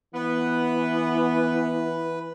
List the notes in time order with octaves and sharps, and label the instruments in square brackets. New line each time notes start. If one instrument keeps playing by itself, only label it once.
[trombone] E3 [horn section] B3 [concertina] B4